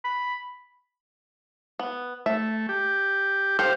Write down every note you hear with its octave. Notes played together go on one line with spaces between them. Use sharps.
B5
B3
A3 E5
G4
G4 A4 C5 F5 G5